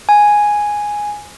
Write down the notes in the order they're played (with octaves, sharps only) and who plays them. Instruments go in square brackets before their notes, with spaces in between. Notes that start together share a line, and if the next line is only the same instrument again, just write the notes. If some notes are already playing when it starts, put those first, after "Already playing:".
[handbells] G#5